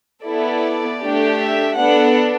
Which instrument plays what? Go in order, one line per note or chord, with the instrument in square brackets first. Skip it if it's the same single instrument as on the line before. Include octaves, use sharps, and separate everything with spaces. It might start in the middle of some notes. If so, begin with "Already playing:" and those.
[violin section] B3 E4 A4 D5
A3 D4 G4
E5
B3 D4 A4 F#5